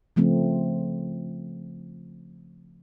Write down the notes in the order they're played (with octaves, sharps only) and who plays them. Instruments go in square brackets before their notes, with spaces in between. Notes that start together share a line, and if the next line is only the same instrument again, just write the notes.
[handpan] C#3 F3 A3 C4